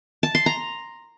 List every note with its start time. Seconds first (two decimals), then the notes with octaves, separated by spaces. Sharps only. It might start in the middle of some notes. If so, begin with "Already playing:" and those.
0.23 A5
0.35 C6
0.46 A#5